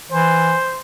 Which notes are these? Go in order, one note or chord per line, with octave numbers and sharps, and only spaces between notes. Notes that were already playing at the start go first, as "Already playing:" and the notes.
E3 C5